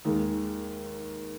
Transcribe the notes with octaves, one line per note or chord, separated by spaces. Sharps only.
D#2 D#3 G#3 D#4